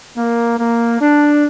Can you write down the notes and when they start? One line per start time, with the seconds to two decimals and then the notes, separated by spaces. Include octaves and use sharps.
0.17 A#3
0.59 A#3
1.01 D4